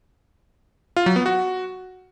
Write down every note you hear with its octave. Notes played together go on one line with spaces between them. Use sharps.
F4
F#3
B3
F#4